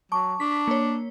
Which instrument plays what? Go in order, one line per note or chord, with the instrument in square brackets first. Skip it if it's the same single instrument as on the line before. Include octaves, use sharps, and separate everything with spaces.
[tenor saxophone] F#3 [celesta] A5 C#6 [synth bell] D6
[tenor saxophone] D4 [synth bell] B6
[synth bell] A#3 C#5